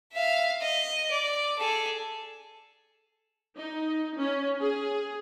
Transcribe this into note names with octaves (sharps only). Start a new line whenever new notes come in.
E5 F5
D#5
D5
G#4 A4
D#4
C#4
G#4